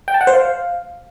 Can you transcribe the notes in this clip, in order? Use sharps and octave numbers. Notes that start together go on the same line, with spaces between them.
G5
A5
F#5
C5
F5